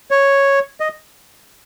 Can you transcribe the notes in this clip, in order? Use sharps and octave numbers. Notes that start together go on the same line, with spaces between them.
C#5
D#5